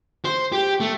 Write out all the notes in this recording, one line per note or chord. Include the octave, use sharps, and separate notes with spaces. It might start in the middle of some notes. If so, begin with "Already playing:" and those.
C5
G4
A3